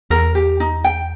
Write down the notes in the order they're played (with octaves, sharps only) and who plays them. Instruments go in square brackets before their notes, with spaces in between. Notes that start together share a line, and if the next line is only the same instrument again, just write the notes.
[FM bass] E2 [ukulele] A#4
[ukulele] G4
D#4
G5